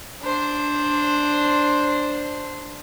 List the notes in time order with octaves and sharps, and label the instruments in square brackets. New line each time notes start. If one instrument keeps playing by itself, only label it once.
[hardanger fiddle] D4 C5